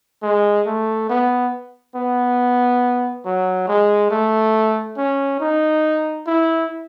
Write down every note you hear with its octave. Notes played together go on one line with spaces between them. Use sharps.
G#3
A3
B3
B3
F#3
G#3
A3
C#4
D#4
E4